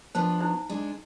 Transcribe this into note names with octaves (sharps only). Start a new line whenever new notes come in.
F3 B3 D4 C5 A5
D#4 E4 C5
G#3 D4